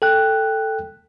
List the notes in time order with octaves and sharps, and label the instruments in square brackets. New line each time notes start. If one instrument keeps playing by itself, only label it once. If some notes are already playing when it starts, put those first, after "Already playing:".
[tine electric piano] A4 G5 F#6